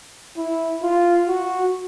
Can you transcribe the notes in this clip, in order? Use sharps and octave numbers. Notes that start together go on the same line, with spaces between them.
E4
F4
F#4